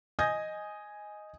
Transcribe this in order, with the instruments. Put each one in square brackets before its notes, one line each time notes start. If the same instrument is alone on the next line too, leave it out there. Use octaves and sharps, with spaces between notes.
[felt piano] D#5 G#5 D#6 G6 G#6 A#6